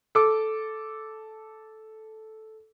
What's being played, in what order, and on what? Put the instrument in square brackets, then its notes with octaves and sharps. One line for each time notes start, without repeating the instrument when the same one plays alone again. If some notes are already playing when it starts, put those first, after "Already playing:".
[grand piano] A4 D6